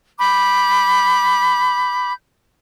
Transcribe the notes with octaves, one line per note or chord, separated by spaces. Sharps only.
B5 D6 G6